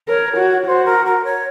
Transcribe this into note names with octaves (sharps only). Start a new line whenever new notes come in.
A#4 C#5
F#4
F#4 C5
A#4
A#4
C#5